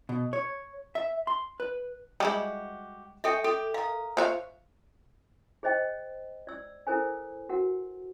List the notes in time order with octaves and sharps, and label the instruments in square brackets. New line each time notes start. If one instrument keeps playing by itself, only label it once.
[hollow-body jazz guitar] B2
C#5
E5
C6
B4
[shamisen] G3 G#3 E4 [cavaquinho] F#4 G4
[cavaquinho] G#4 G5 C#6 [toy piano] A4 E5
[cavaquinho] G4 [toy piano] A4
[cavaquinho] A#4 D#6 [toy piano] F5
[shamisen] F4 E5 F5 [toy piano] C5 [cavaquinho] C#5
[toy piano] G#4 C5 D#5 G5
D5 E6
E4 A4 A#4 C5 G#5
F#4 A#4 F#5